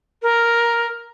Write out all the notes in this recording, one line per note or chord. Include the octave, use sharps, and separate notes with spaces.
A#4